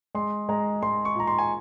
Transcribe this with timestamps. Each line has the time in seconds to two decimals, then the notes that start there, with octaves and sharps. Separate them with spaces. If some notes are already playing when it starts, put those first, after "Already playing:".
0.15 G#3 C6
0.49 G#3 A#5
0.83 G#3 C6
1.05 C#6
1.15 A#2 A#5
1.27 C6
1.39 G#5